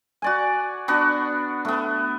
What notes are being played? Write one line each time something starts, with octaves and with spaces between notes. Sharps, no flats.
F#4 D5 G#5
B3 D4 F#4
A3 B3